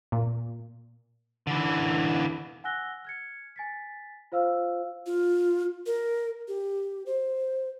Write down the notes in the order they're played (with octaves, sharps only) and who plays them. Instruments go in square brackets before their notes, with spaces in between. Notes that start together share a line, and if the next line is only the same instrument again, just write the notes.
[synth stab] A#2
[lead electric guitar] D3 E3
[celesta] F#5 G#5 E6 F#6 A#6 G7
F6 G#6 C#7
G#5 A6 B6
F4 C5 F5 E6 F6
[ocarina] F4
A#4
G4
C5